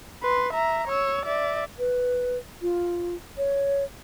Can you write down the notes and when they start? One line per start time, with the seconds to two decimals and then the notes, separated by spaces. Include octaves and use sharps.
0.22 B4 C6
0.53 E5 A#5
0.87 C#5 E6
1.25 D5 E5
1.79 B4
2.62 F4
3.38 C#5